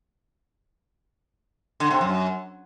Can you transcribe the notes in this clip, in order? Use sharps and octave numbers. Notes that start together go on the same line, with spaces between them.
D3
C3
F#2